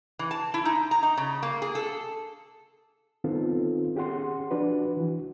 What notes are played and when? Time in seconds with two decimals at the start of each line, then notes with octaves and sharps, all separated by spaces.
0.19 E3
0.31 A5
0.54 E4
0.65 D#4
0.91 A#5
1.03 D#4
1.18 C#3
1.43 A#3
1.62 G#4
1.75 A4
3.24 D#3 B3 C4 D#4 F4 A4
3.95 C#4 G4 G#4 F#5 C6
4.51 F3 D4 F#4 B4
4.97 E3 F#4